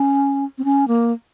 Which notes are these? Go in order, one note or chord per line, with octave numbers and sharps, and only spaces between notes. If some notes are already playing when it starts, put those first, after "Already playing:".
Already playing: C#4
C4
C#4
A#3